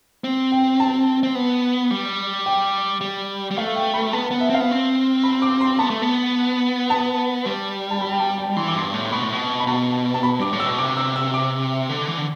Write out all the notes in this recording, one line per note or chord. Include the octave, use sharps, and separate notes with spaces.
C4
G5
A5
C4
B3
G3
G5
G3
G3
A3 F5
G5
B5
B3 A5
B3 A5
E5
C4 F5
B3
C4
B5
D6
C6
B3 A5
A3
B3
A5
G3
A5
B5
G5
A5
G5
E3 C6
D6
G2 C6
A2
C6
B2 B5
A2
B2
B5
B2 A5
A5
B5
G2 D6
A2
E6
B2
C3 D6
E6
E6
D6
D3
E3
D3